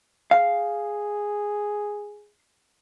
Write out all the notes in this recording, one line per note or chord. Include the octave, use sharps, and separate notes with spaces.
G#4 F5